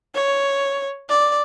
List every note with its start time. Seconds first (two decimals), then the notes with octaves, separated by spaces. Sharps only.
0.15 C#5
1.09 D5